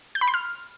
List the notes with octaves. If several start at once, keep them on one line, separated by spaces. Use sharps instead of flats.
G6
B5
C6
F6